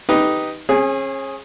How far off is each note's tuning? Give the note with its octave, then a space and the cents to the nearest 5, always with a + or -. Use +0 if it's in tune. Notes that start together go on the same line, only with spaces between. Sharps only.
D#4 +5 G4 +0 B4 +0
C#4 -35 G#4 +0